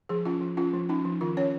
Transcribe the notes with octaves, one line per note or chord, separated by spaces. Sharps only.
F3 G#4
C#4 F4
F3
C#4 F4
F3
C#4 D#4
F3
D#3 F4
C#4 C#5